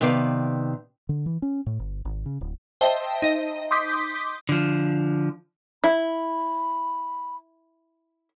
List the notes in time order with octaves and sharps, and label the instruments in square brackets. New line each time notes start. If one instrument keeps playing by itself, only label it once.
[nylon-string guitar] C3 D#3 B3 D5 F5
[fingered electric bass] D3
E3
C#4
A2
G1
G#1
C#3
D1
[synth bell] C5 D#5 E5 G5 A5
D#4 D#5
C6 D6 D#6 G6 B6
[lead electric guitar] D3 F3
[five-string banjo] E4 [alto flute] B5